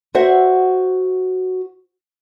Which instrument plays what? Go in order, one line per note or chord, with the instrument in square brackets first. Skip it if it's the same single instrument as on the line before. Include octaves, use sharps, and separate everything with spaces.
[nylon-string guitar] F#4 C5 E5 F#5